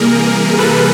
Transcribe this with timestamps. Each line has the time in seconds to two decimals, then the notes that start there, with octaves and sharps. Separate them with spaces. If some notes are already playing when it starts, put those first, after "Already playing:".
Already playing: C3 E3 G3 A#3 G#4 A#4
0.58 A4 B4